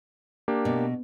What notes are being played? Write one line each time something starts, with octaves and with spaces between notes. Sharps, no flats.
A#3 D4 G4
B2